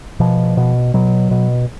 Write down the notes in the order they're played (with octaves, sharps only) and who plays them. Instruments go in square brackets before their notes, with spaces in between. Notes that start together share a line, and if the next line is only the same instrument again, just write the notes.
[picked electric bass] B2 F3
B2
B2 F#3
B2